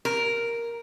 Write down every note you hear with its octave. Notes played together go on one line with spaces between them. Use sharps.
A#4